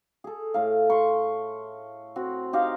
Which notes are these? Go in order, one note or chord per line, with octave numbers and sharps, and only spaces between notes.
G#4 A4
A2 F5
C6 C#6
C4 F#4
D#4 G4 D#5 F5